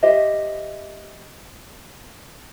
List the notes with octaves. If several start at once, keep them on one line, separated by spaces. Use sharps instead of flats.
G4 C5 D#5 E5